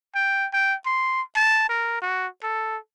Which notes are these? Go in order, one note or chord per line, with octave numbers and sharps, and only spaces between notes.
G5
G5
C6
A5
A#4
F#4
A4